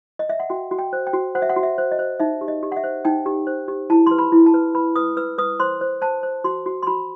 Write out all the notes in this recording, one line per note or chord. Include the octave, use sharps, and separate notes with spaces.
D#5
E5
F#5
F#4 G5
F#4
G5
C5
G5
F#4
C5 F#5
E5
F#5
F#4
E5
C5
D#5
C5
D#4 E5
G4
D#5
G4
F#5
E5
C5
D#4 G5
G4
C5
G4
E4 A5
B4 C6
B5
E4
A5
B4
B4 B5
B4 D#6
B4 E6
B4 D#6
C5 C6
C5
C5 A5
C5
F#4 C6
F#4
C6
F#4 B5